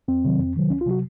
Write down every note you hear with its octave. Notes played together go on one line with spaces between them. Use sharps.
F2 C4
C3 D#3 F#3
F2
C3 D#3 F#3
C#2 C#4
F4
C3 F#3 F#4